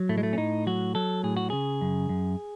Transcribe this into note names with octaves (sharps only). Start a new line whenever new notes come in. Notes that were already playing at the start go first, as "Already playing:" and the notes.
Already playing: F#3
A2 A3
G#3
A3
C#4
A2 D#4
F#3 F#4
F#3 A4
A2 G#4
F#4
C#3 G#4
F#2
F#2